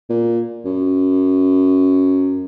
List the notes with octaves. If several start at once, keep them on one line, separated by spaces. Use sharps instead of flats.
A#2
F#2